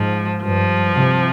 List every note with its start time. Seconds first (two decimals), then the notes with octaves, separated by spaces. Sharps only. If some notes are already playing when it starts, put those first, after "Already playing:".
Already playing: G#2 F3
0.43 G2 F3
0.94 C3